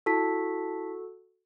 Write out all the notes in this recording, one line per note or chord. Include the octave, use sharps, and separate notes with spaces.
E4 F#4 A4 A5 B6